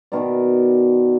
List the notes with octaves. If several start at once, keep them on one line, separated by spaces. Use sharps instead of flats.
B2 D#3 A#4 D5